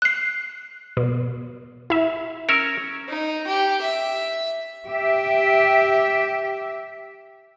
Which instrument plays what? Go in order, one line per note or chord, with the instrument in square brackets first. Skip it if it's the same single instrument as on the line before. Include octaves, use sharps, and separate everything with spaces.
[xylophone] F#6 C7
[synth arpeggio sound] B2
E4 E5
[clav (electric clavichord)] C#4 A#4 C#5 [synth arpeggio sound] E6
[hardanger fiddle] D#4
G4
E5
[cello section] G4 E5